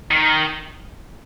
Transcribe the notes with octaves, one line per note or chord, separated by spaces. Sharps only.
D#3